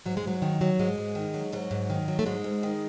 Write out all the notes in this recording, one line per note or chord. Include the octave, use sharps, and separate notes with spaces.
G#2 F#3
G#3
G#2 F#3
D#3
F#3
G#2 G#3
G#2
D#3
F#3
G#2 F#3
G#2
D#3
F#3
A3
G#2 G#3
G#2
D#3